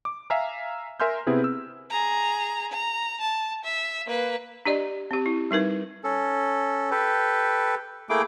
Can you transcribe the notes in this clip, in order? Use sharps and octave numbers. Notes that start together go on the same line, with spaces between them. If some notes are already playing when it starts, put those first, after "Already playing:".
D6
E5 F5 G#5 A#5 F6
A#4 E5 G#5 C6 F6 G6
C3 B3 C4 E4 G#4 B4
E6
G#4 A#5
A#5
A5
E5
A#3 B4
D4 G4 D5 D#5
C4 G4
E4
G3 D#4 A#4 B4
C#4 A4
G4 A4 B4
A3 A#3 E4 G#4 G5 D6